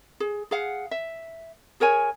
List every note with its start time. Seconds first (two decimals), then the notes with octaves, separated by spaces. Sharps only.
0.20 G#4
0.51 G#4 F5 F#5
0.91 E5
1.80 G#4 A#4 C#5 G#5